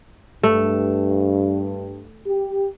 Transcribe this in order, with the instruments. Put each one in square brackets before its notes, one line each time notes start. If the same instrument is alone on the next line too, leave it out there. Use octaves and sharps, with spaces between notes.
[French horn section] G2 [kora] A3
[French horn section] G4